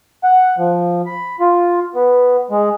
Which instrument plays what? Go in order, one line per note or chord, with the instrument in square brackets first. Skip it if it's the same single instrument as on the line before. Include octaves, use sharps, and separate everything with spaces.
[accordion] F#5
F3
B5
F4
B3
G#3